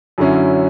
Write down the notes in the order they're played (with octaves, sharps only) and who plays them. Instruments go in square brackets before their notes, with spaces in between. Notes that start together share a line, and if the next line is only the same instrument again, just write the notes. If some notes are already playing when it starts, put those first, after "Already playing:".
[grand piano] F#2 D3 F#3 C#4 E4